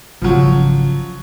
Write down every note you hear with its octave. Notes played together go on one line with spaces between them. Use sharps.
G#1 C#3 F3 F#3